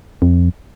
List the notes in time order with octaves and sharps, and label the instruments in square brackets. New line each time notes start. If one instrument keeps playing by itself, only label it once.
[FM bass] F2